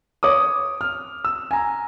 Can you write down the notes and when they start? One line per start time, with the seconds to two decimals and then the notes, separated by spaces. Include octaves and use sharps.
0.23 C#5 D6 D#6
0.81 F6
1.25 E6
1.51 G#5 A#5